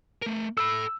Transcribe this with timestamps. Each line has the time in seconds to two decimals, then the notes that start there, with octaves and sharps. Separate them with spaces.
0.22 A3 A#4
0.58 A4 B5 E6